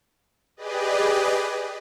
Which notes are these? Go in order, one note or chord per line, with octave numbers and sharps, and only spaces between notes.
G4 G#4 B4 D5 D#5